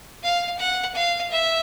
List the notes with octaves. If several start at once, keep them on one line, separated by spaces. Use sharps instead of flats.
F5
F#5
F5
E5